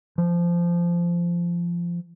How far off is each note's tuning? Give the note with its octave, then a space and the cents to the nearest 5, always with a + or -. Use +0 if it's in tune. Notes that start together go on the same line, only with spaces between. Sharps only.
F3 -20